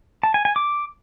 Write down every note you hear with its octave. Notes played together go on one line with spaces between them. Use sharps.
A5
G#5
G#5
D6